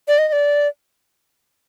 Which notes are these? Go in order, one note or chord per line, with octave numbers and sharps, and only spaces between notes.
D5
D#5
D#5
D5